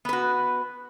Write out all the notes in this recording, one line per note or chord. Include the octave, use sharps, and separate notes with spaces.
B3 F#4 B4